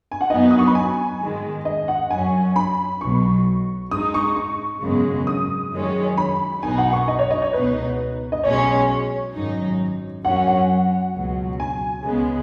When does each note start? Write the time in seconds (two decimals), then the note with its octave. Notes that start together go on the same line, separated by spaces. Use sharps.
0.12 G#5
0.21 F#5
0.30 F#2 F#3 B3 D#4 D#5
0.51 D#6
0.59 C#6
0.67 B5
0.75 G#5
1.20 G#2 D#3 G#3
1.65 D#5
1.88 F#5
2.10 F#2 F#3 C#4 G#5
2.56 B5
3.01 B1 B2 F#3 C#6
3.91 G#2 G#3 D#4 D#6
4.14 C#6
4.36 C#6
4.82 G#1 F#2 C#3 G#3 B3
5.27 D#6
5.72 F#2 D#3 G#3 C#4
6.17 B5
6.62 B1 B2 B3 D#4 G#5
6.78 F#5
6.93 C#6
7.08 D#5
7.19 C#5
7.31 D#5
7.42 C#5
7.53 C#2 B2 B3 D#4 B4
8.32 D#5
8.43 B1 B2 G#3 C#4 C#5
9.34 G#1 F#2 F#3 D#4
10.25 F#2 F#3 C#4 F#5
10.47 F#5
11.15 C#2 B2 F#3
11.60 G#5
12.05 C#2 C#3 G#3 B3